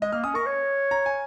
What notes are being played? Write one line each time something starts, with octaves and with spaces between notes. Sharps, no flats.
G#3 D#5
A#3 F6
C#4 D#6
A#4 C#6
C#5
A#5
G#5